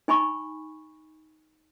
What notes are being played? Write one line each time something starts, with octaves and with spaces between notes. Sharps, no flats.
D#4 G#5 B5 C#6